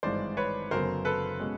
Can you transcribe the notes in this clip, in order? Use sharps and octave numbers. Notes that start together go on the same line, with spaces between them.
G#1 G2 E3 G#3 C5 D5
B4 C#5
F#1 F#2 D3 F#3 B3 A#4 C5
A4 B4
B2 G#3 C#4